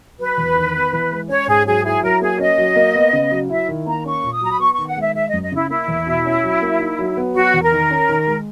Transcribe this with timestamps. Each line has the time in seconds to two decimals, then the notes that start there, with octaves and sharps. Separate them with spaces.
0.19 F#3 B4
0.38 E2
0.56 D#3
0.74 B3
0.93 E3
1.11 G#3
1.29 C#4 C#5
1.47 G#2 G#4
1.66 F#3 G#4
1.84 E4 G#4
2.03 F#3 A#4
2.21 A#3 G#4
2.39 C#4 D#5
2.58 F#3
2.76 A#3
2.95 B3
3.13 C#3
3.31 F#3
3.50 E4 E5
3.68 D#3
3.86 A#3 A#5
4.05 C#4 C#6
4.24 A#2
4.33 D#6
4.41 F#3 A#5
4.52 B5
4.60 B3 C#6
4.74 D#3 C#6
4.88 F#5
4.96 G#3 E5
5.15 G#3 E5
5.29 F#2 D#5
5.43 D#5
5.52 C#3 E4
5.70 A#3 E4
5.88 E2
6.07 B2
6.25 C#4
6.43 F#3
6.62 A#3
6.80 D#4
6.99 F#3
7.17 B3
7.35 F#3 F#4
7.54 E2
7.63 A#4
7.72 D#3
7.91 C#4
8.09 D#3
8.27 G#3